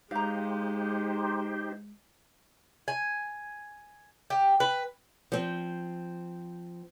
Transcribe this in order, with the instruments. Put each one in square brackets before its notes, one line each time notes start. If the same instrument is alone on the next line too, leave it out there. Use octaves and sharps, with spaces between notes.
[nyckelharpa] G#3 [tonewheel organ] D#4 G4 C5 [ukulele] F5 A#5
[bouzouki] G#5
G4
B4
[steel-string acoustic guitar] F3 C4